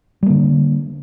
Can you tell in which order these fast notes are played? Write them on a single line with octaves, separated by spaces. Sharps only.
G3 A#3 D3